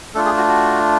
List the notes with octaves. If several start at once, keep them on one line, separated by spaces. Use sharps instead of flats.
A3 D4 F4 A4
G#4
F#4
F#4